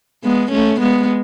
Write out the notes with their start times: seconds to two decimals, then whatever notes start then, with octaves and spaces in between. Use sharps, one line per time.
0.24 G#3 B3
0.51 A3 C#4
0.80 G#3 B3